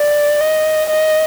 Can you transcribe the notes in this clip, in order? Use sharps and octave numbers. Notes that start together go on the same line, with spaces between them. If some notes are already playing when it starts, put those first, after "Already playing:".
Already playing: D5
D#5
D#5